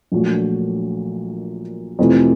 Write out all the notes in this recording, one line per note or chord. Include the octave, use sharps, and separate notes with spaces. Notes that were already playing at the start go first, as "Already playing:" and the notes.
A#1 A#2 F#3 A3 D4
F2 C3 E3 A3